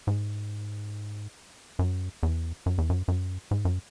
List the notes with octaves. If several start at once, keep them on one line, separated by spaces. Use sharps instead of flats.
G#2
F#2
E2
F#2
E2
F#2
F#2
G#2
F#2